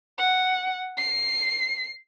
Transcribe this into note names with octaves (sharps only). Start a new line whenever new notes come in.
F#5
C7